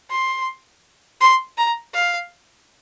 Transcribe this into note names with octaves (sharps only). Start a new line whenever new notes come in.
C6
C6
A#5
F5